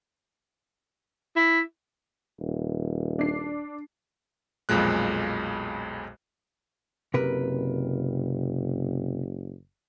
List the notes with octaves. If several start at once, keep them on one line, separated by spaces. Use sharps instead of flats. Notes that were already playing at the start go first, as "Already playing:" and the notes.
E4
D#1
D4 C7
B1 F2 A#2 G#3 F#6
F#1 C3 A#4 B4